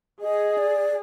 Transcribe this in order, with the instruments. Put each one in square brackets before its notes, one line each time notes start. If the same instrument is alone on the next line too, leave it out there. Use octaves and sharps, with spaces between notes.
[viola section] G#4 [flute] D#5
[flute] D5